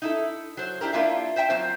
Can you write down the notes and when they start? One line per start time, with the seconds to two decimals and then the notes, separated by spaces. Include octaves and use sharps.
0.02 D#4 E4 A4
0.57 F#3 C5
0.81 D4 E4 G4 A#4
0.93 A#3 D4 E4 F4 G4 E5
1.36 C5 E5 G5 A5
1.50 F#3 C4 F4 C5